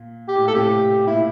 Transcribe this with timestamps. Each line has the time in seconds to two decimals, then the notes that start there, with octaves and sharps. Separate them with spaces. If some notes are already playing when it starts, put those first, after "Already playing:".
Already playing: A#2
0.28 G4
0.35 A2
0.45 A#2 A4
0.54 A2 C3 G4
1.07 A#2 E4